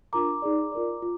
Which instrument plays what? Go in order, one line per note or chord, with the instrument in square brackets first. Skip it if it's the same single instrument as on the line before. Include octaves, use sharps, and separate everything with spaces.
[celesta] D4 F4 A#4 A#5 D6
D#4 G#4 D5
F4 A#4 D5
F4